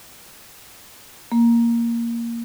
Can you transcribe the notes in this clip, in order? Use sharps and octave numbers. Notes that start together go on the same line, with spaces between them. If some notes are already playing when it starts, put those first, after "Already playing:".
A#3